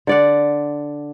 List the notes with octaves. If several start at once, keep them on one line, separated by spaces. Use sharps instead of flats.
D3 D5 F#5